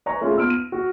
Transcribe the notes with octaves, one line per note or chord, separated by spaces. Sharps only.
B4 D5 G#5 A#5 C#6
A3 C#4 F4 G#4
B3 F4 E6 F6 D7
D#7
F#4